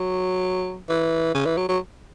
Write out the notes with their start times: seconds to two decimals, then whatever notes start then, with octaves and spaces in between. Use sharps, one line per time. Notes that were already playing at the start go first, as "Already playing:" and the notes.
Already playing: F#3
0.89 E3
1.34 C#3
1.46 E3
1.57 F#3
1.69 F#3